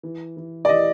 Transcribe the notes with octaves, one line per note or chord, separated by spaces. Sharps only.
E3
E3
D5
E3 D#5